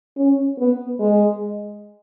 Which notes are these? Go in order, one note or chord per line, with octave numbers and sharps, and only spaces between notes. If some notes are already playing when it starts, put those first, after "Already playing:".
C#4
B3
G#3